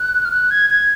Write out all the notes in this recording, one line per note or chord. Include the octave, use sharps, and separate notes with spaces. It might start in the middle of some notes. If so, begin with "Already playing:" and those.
Already playing: F#6
F6
F#6
G#6
G#6